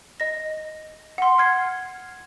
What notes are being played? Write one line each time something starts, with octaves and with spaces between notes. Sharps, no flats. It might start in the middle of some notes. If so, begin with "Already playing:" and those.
D#5 A#6
F#5 C6
F6 G#6 C7